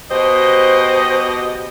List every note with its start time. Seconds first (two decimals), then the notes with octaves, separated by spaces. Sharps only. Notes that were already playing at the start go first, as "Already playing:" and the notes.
0.11 B2 G4 C5 D#5